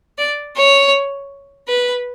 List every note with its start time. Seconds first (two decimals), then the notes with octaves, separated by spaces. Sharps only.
0.18 D5
0.56 C#5
1.68 B4